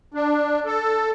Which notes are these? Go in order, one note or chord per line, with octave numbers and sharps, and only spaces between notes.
D4
A4